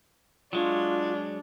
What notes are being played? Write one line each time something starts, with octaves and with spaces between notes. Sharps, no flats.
F#3 G#3 D4 F4 C#5